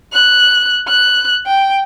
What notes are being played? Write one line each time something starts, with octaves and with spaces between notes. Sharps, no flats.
F#6
F#6
G5